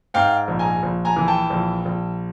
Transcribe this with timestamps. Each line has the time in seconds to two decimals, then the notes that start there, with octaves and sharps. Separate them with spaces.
0.14 G#2 F5 G5
0.48 A#1
0.59 G#5 A#5
0.83 A#1
1.05 G#5 A#5
1.16 E3
1.28 G5 A5
1.50 A#1
1.85 A#1